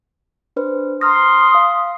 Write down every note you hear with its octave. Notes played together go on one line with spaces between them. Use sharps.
D4 B4 C5
A#5 C6 D#6 F6 A#6
F5